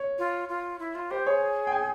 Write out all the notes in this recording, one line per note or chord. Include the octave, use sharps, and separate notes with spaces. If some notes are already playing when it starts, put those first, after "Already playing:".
Already playing: C#5
F4
F4
E4
F4
G4 C5
G#4 C#5
G5
G#5